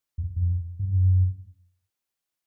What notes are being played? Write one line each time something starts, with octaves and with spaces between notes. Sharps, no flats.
E2
F2
G2
F#2